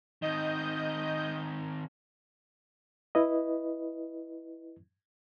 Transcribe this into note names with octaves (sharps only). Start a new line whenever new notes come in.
D#3 C4 D#5 G6
E4 B4 D#5